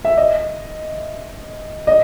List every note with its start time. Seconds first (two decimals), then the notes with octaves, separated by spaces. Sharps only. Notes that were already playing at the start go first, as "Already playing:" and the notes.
0.05 E5
0.17 D#5
1.87 D#5